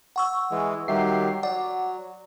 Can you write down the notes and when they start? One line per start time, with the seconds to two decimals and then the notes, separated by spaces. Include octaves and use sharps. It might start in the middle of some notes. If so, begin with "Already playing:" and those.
0.16 F#5 C#6 E6
0.51 E3 G#3
0.88 D#3 F#3 G3 G4 E5 C7
1.43 F#3 D5 F#5